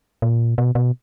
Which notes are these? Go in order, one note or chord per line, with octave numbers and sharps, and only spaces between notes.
A#2
B2
B2